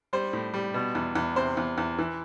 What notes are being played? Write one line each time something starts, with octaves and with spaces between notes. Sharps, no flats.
G3 C5
A2
G3
B2
E2
E2
C3 C5
E2
E2
E3